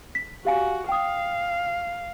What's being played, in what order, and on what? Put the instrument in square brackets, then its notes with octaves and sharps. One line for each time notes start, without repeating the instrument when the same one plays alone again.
[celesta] B6
[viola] F#4 [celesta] G4 F5 G#5
[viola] F5 [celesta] G5 D#6